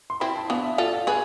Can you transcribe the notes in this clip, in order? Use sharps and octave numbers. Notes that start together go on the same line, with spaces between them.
C6
C4 E4 B5
A5
B3 D4 F5
E5
F4 A4 D5
F5
G#4 B4 G#5